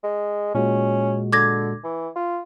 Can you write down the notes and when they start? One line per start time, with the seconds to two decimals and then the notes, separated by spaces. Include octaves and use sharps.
0.04 G#3
0.55 A#2 G#3 C#4 F#4
1.33 D3 D6 G#6 A#6
1.84 E3
2.16 F4